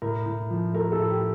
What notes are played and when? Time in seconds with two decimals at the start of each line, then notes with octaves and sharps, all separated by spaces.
0.02 A2 A#4
0.26 A2
0.50 F3
0.74 A3 A#4
0.92 A4
0.99 A2
1.11 G4